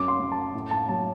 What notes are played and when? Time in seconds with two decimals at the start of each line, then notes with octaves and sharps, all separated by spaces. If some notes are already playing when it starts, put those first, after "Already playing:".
Already playing: F#2 D6
0.08 C6
0.20 F#2
0.32 A5
0.54 A2
0.71 A5
0.89 F#3 A5